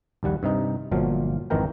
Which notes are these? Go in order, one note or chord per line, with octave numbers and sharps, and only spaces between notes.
A#1 D#2 G3 F#5
G2 C3 D#4
G1 A#2 F3 F#3 F5
G#1 F2 D#3 E3 A#4 G5